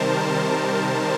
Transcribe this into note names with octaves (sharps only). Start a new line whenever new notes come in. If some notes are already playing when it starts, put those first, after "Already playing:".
Already playing: C3 D#3 G3 A#4 C5 A5
A#4
C5